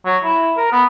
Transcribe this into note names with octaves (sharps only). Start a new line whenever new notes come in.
F#3
E4
A#4
B3